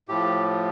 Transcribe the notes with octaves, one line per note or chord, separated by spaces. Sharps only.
A2 F3 G4